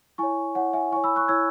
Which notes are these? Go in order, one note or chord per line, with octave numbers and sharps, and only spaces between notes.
E4 C#5 G#5 C#6
E4 C#5 F#5
E5 G#5
E4 C#5 G#5 C#6
B5 E6
C#6 F#6
E4 C#5 E6 G#6